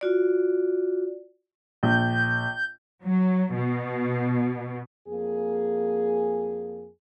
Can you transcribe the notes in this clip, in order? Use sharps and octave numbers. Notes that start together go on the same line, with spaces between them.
F4 F#4 D5
A#1 G6
F#3
B2
F2 A#3 G#4